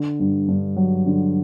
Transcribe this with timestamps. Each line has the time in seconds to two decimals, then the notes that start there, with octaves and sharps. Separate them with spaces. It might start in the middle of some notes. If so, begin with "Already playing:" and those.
Already playing: D3
0.19 G2
0.48 G2
0.76 F#3
1.06 D3